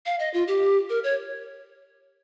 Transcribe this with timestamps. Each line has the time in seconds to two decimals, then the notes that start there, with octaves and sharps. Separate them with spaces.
0.06 F5
0.19 D#5
0.34 F4
0.48 G4
0.89 A#4
1.04 C#5